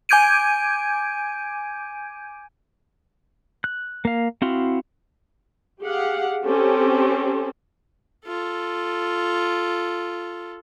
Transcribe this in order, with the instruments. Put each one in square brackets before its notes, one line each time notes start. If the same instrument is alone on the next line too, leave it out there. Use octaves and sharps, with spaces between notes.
[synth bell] G#5 D6 G6 G#6 D7 D#7
[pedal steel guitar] F#6
A#3 F5
C4 E4 F#4 F5 C6
[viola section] G4 G#4 F5 F#5
C4 C#4 G4 A4
[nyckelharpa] F4 A4